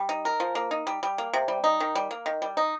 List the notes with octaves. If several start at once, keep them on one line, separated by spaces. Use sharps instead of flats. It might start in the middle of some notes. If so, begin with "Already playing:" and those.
Already playing: G3
D#4
A#4
F3
A#3
D#4
G3
G3
A#3
C3
G3
D#4
D#3
G3
A#3
D#3
G3
D#4